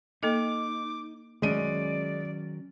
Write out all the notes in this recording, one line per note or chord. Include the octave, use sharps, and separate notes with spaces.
A#3 D#4 A4 D#5 D6
D#3 F#3 G#3 C#4 D5 D#7